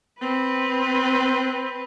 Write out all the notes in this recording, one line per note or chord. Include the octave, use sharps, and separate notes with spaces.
C4 B4